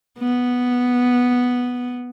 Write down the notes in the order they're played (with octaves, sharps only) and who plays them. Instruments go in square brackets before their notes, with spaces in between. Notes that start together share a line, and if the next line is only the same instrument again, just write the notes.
[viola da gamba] B3